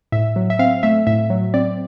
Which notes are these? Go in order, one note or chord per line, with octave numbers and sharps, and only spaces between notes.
A2 E5
F#3
E5
C4 F5
A3 E5
A2 E5
F#3
C4 D5